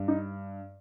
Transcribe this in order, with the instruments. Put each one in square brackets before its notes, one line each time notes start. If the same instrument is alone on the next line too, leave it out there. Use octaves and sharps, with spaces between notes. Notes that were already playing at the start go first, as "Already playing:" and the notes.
Already playing: [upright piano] G2
D#4